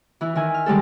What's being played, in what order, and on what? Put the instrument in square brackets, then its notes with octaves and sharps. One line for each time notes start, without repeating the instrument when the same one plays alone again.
[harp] E3 E4
D#3 E4 G#5
F6
D#3 G3 G#3 A4